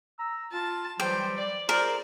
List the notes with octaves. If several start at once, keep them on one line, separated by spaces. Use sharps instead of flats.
A#5 E6
F4 A5
E3 F#3 G3 C5 G5
D5
F4 G#4 A#4 C5 D5